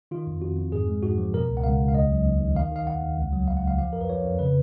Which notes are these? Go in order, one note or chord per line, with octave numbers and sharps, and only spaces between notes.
D#3 F4
F2
F2 F#4
F2
G#2 G#4
G#3
G#2 F#4
F3
B2 A#4
C#2
F#5
C#2 F5
C#2
F5
D#2 D#5
F#3
D#2
D#2
D#3 F5
D#3 F5
D#2 F#5
D#2
C#2
F#3
C#2 F5
F#5
C#2
F5
F3 F5
F2 A#4
B4
F3 C#5
F2
C#3 B4